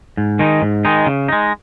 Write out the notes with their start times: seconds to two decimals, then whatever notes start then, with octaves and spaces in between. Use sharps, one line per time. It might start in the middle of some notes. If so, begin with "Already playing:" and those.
0.17 G#2
0.39 D#3 G#3 D#4
0.62 G#2
0.85 D#3 G#3 D#4
1.06 C#3
1.28 G#3 D#4